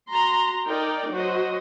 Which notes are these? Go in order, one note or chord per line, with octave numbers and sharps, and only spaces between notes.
F#4 A#5 C6
D#4 A#4 D5 G5
F#3 F#4 C5 D#5